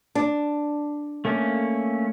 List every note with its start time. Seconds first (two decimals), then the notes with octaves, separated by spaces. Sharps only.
0.15 D4
1.25 A3 A#3 C#4